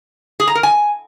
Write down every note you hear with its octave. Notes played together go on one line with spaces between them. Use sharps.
G#4
A#5
A#4
G#5